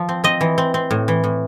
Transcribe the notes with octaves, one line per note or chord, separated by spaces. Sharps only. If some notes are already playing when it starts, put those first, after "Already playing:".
Already playing: F3
C4
C4 D#5
E3
C4
C4
A2
E3
A2